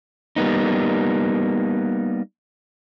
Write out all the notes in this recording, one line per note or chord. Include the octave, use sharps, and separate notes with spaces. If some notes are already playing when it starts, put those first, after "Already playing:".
G3 A#3 B3 D#4